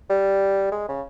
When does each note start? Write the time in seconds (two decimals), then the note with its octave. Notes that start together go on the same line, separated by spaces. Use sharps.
0.10 G3
0.72 G#3
0.89 C#3